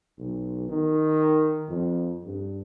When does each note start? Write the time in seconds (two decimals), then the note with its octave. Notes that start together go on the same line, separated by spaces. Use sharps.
0.18 B1
0.69 D#3
1.69 F2
2.24 G2